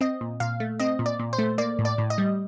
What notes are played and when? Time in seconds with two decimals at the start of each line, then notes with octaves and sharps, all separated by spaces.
0.01 C4 D#5
0.21 A#2
0.40 A#2 F5
0.60 A3
0.80 C4 D#5
0.99 A#2
1.06 D5
1.19 A#2
1.33 C5
1.39 A3
1.58 A#3 D5
1.79 A2
1.85 D5
1.98 A2
2.10 D#5
2.18 G3